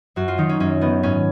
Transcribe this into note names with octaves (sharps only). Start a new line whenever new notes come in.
F#2 F#4
F4
D#3 D#4
C#4
F#2 C#4
D#3 B3
G#2 C#4